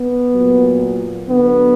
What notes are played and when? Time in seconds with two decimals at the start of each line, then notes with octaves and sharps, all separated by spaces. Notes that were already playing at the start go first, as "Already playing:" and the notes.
Already playing: B3
0.34 A#2 F#3
1.29 D3 F#3 B3